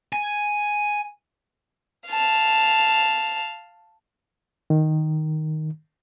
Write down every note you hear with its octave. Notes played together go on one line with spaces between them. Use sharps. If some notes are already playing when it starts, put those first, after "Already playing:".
G#5
F5 A5
D#3